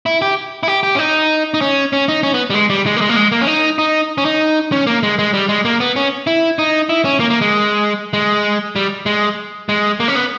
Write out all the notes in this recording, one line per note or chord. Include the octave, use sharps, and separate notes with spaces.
E4
G4
E4
G4
G4
C#4
D#4
D#4
C#4
C#4
D#4
C#4
B3
G3
G#3
G3
G#3
A#3
G#3
A#3
G#3
A#3
C#4
D#4
D#4
C#4
D#4
C#4
A#3
G#3
G#3
G3
G#3
A#3
B3
C#4
E4
D#4
E4
C#4
A#3
A#3
G#3
G#3
G3
G#3
G#3
A#3
C#4
B3